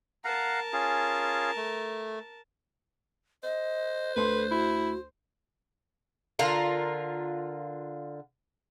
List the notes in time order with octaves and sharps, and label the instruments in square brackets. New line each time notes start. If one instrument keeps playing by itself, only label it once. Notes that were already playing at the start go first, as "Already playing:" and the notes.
[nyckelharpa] A#4 A5 [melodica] F5 F#5 A#5
[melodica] C#4 F4 G#4
A3
[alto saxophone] C5 [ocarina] D#5
[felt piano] D2 C6 [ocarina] A4 [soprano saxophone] B4
[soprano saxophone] E4 [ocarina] F#4
[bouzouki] D3 F4 A#4